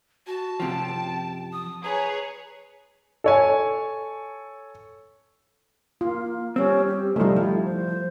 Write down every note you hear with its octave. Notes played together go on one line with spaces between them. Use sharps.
F#4 A5
F#2 C3 F3 G5
D#6
G#4 B4 C#5 A#5
A4 C#5 G#5
A#3 F4
G3 C4 C#4
G4
C3 F3 G3 A3 D#4
F3 E4
C5